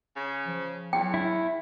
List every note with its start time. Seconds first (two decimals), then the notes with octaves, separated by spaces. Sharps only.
0.16 C#3
0.46 F3
0.93 E2 F#3 G5
1.14 E4